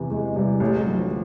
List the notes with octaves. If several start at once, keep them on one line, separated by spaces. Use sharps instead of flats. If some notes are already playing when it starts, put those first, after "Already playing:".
Already playing: E2 C3 E3
E2 G#3
C3 E3 G3
A1 A3
G#3
G2 D3 F#3
F3